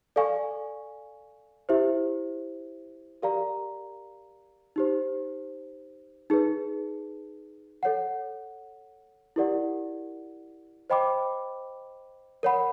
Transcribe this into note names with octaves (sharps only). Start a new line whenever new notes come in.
A4 D5 F5 G#5 C#6
E4 G4 C5 E5
G4 A#4 D5 F5 A#5
D#4 G4 C5
D#4 G#4 B4
A4 C#5 F#5
E4 G4 A#4 D5 F#5
C5 D#5 G5 B5 D6
A#4 C#5 F#5 B5